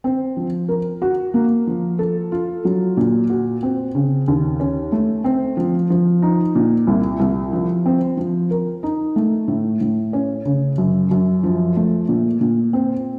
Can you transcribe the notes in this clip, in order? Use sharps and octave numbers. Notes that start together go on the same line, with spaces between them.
C4
F3
A#4
F#4
A#3
F3
A4
F4
F#3
A#2
F#4
C4
C#3
D#2
C#4
A3
C4
F3
F3
D#4
A#2
C2
C2
F3
C4
F3
A#4
D#4
A3
A2
A2
C#4
C#3
F#2
F#2
F3
A3
A#2
A#2
C4